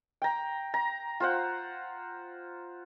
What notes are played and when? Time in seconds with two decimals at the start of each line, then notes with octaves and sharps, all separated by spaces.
0.22 G5 A#5
0.74 A#5
1.20 F4 C5 F#5